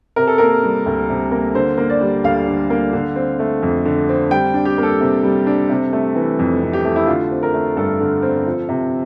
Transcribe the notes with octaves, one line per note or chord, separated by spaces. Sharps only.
C3 A#4
A4
A#3 A#4
G3
D2
C3
A#3
D3 C5
A#3
D5
G3
D2 F5
D3
A#3
D3
C4
A3
F2
D3
C4
G3 G5
D4
G4
A#3
A4
C3
G3
D4
C3
A3
E3
F2
C3
G4
A3
E4
D3 F4
C4
A#4
A3
G2 A4
D3
C4
F3
C3